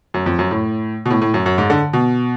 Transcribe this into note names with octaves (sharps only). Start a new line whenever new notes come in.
F#2
F2
F#2
A2
B2
A2
A2
F#2
F#2
G#2
D3
B2